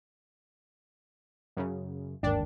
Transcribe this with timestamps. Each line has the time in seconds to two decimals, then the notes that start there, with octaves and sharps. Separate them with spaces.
1.57 F#2 C#3
2.23 G1 D#2 G#2 D4 A#4 D5 G5